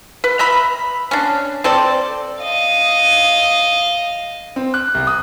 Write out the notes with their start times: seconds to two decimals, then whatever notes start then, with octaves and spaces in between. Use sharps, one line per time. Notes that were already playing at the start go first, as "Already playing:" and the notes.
0.24 B4
0.39 D#5 E5 A#5 B5
1.11 C#4 D4
1.64 C4 A4 C5 D5
2.43 D#5 F5
4.56 C4
4.74 F#6
4.95 C2
5.07 D#6